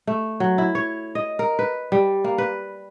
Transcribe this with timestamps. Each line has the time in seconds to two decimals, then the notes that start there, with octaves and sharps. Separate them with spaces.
0.07 A3
0.40 F#3
0.58 E4
0.75 C#5
1.15 D#5
1.39 A#4
1.59 B4
1.92 G3
2.24 A#3
2.38 B4